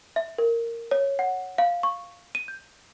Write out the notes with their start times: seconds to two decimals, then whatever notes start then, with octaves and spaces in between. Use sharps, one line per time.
0.16 E5
0.38 A#4
0.91 C#5
1.19 F#5
1.58 F5
1.83 C#6
2.35 D#7
2.48 G6